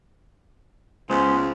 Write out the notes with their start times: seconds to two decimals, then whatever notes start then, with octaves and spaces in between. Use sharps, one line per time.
1.10 C#2 G#3 B3 C#4 C5